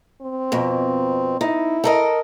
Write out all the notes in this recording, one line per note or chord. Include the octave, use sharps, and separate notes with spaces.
C4
F2 B2
D#4 E4
A4 A#4 D#5